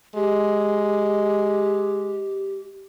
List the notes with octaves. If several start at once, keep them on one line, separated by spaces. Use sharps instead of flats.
G#3 G4